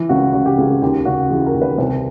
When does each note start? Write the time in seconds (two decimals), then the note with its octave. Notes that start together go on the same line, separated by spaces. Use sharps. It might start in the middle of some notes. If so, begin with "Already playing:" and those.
Already playing: E3
0.09 C#2 F#4
0.33 C#3 F#4
0.46 G4
0.58 C#2 G#4
0.70 G4
0.82 D#2 G4
1.05 C#3 F#4
1.30 E3 G#4
1.46 A#4
1.54 D#2
1.62 B4
1.78 C2 C5